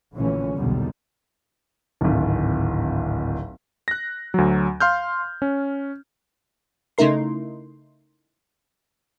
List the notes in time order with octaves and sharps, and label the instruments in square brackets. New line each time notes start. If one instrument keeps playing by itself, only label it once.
[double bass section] A#1 A#2 D3 E3 A3 C#4
B1 E2 D3 D#3 G3
[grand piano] D1 G#1
[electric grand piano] F#6 A#6
D2 F#3
F5 C6 F6 G6
C#4
[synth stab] C#3 A3 D#4 E4 A#4 C6